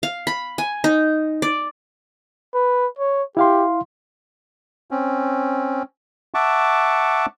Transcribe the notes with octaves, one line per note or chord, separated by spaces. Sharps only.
F5
B5
G#5
D#4
D5
B4
C#5
E4 G4 F5 C6
C4 C#4
E5 F#5 A5 C#6 D6